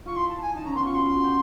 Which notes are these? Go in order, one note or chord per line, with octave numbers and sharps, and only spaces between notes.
F4 C#6
E4 C6
A5
G#5
D#4 A5
C#4 A#5
B3 C6
F4 C#6
F#4 C6
F4
F#4
G4